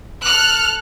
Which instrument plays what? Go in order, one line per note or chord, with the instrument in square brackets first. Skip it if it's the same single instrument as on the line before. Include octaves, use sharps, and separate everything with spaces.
[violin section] A4 F6 F#6